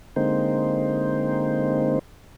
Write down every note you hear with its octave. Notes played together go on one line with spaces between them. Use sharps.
D3 G#3 A#3 C4 D#4 C5